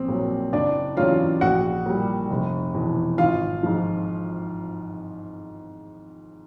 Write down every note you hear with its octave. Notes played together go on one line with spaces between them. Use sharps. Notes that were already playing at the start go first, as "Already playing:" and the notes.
Already playing: A#1 C4
A#2 F#3
F#1 D4 D5
E2 C#3 F#3 F4 F5
A#1 F#4 F#5
A#2 G3
F1
E2 B2
G#1 F4 F5
G#2 F3